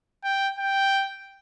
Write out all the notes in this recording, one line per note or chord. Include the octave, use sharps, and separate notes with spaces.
G5
G5